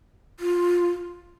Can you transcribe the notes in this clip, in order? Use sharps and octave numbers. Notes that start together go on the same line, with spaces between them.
F4